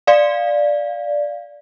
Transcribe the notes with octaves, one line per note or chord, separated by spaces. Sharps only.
D5 F5